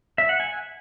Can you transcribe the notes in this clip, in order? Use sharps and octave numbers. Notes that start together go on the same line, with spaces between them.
E5
F#5
G#5